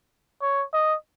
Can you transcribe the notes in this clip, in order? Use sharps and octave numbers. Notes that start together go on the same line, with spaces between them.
C#5
D#5